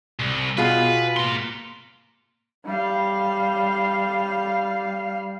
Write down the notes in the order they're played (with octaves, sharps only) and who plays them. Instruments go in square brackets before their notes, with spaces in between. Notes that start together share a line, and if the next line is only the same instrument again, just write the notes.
[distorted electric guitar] C2
[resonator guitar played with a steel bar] B2 F4 G#4 [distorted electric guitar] B4
[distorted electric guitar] A#3 C6
[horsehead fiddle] G3 F5